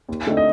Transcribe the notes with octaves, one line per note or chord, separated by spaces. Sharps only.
D#2
D3 A3 C4 D#4
D#5